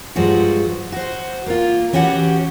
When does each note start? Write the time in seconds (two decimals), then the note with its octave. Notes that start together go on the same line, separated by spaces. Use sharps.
0.16 G2 F3 G#3 F#4
0.92 F#4 C5
1.46 A#3 F4
1.93 E3 C#4 F#4 G4 F#5